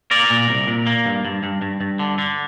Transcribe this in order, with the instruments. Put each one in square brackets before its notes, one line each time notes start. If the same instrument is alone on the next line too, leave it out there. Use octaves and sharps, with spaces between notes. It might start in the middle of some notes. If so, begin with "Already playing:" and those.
[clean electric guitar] A#3 A#4 D5
A#2
C2
A#2
A#3
G2
G2
G2
G2
G2
D3
D3